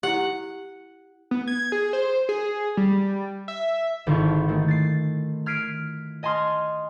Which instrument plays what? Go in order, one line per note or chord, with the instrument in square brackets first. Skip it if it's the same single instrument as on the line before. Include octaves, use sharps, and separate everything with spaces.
[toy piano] E4 G4 [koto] F#5
[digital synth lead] B3
G#6
G#4
C5
G#4
G3
E5
[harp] G#1 D3 E4 F4 A5 C#6
D#3 G#3 A3
A6 C7
F6 G#6 B6 C7 D7 D#7
D#5 G#5 A5 C6 D#6 F6